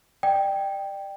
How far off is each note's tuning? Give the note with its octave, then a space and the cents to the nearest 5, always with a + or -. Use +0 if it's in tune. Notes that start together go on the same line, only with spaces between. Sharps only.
D5 +35 G5 +0